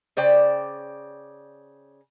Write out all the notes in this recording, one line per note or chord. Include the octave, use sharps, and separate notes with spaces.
C#3 C5 D5 G5